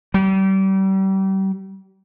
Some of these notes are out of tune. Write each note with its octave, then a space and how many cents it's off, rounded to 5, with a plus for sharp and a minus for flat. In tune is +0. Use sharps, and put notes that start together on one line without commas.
G3 -35